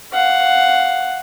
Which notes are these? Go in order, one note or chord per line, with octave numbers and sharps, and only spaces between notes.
F5 F#5